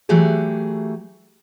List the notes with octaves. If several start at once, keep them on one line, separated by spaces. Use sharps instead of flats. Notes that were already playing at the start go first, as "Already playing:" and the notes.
E3 F#3 A3 G4 G#4